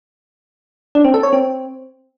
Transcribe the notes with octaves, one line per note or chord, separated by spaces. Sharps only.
D4
C4
A4
C#5
C4